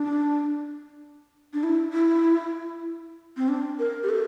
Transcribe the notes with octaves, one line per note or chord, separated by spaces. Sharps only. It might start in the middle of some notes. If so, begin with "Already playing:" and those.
Already playing: D4
D4
E4
E4
C4
D4
A#4
G4
A4